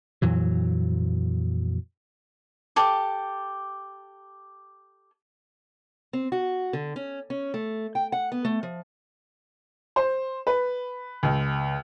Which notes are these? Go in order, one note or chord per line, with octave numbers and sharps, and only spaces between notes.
F2 A#2 E3 F#3
G4 A4 D6
C4
F#4
D3
C#4
C#4
A3
G5
F#5
B3
A3
F3
C5
B4
C#2